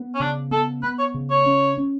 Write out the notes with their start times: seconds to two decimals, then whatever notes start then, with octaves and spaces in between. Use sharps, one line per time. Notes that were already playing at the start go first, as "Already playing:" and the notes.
Already playing: B3
0.15 C#4
0.20 C#3 D4
0.51 B3 A4
0.83 B3 B4
0.98 C#5
1.14 C#3
1.30 C#5
1.46 C#4
1.78 C#4